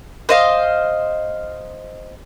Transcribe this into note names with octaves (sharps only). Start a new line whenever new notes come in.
C5 D#5 F5